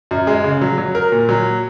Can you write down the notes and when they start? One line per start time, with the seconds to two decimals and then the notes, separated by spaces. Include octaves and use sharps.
0.11 F#2
0.27 G#3
0.44 C#3
0.61 F#3
0.78 F#3
0.95 A#4
1.12 A#2
1.29 F#3